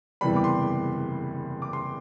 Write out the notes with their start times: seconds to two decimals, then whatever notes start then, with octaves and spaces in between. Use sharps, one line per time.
0.21 F#1 E2 C3 E3 G3 B5
0.36 D6
0.44 C6
1.62 D6
1.73 C6